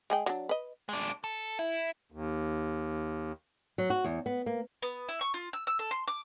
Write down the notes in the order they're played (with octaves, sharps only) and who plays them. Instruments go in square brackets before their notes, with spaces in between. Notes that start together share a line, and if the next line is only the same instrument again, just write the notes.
[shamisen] G#3 G#4 G5
F#3 D4
B4 D#5
[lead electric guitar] G#3 D4
A4
E4
[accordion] D#2
[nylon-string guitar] F#3
F#4
E2
B3
A#3
[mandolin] B3
E4
C#6
F4
E6
E6
A4
C6
D6